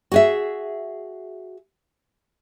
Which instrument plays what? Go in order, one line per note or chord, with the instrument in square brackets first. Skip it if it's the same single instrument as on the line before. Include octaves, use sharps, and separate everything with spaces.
[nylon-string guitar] F#4 G#4 E5